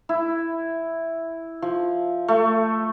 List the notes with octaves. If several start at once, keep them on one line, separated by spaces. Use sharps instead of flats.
E4
F3
A3